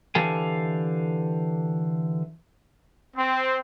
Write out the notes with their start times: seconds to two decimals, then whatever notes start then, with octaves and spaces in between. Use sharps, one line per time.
0.15 D3 E3 G4 A4 F5 G#5
3.16 C4